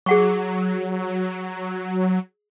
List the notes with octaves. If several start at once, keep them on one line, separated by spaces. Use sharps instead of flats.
F#3 G#4 F#5 C#6